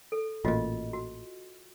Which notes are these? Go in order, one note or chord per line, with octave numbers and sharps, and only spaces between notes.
A4
A1 A#2 F4 F#4 D#5
F#4